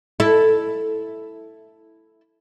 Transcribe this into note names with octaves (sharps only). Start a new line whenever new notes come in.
E4 A4